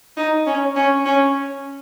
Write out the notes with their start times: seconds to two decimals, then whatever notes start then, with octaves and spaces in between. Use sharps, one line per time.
0.17 D#4
0.46 C#4
0.76 C#4
1.05 C#4